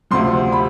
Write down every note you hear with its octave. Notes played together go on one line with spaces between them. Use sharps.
D2 C3 F3 C6
B5